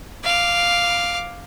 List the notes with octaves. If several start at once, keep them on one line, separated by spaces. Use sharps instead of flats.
F5 D6